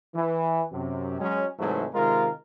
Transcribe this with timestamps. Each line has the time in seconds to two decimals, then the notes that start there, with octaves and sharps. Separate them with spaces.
0.15 E3
0.72 F#2 C3
1.20 F#3 G#3 C#4
1.59 G#2 C3 E3 F#3 G#3 A3
1.94 C3 D#3 G#3 F4 A#4